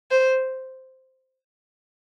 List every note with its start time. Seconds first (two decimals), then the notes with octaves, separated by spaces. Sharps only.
0.11 C5